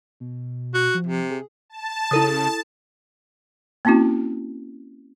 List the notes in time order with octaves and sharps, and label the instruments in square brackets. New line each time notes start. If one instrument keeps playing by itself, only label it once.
[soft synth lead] B2
[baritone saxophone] F#4
[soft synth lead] F3
[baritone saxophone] C3
[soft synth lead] G#4
[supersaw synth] A5
[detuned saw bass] C#3 [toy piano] E4 A4 D#6
[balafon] A#3 C4 C#4 E4 F#4